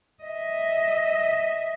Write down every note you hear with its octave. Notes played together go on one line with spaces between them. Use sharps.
D#5 E5